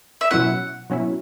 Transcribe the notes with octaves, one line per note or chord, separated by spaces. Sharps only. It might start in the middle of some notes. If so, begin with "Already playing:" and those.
E5
B2 F#3 C#4 E4 F#5
B2 F#3 C#4 E4